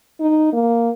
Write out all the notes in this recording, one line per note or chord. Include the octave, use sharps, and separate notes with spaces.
D#4
A#3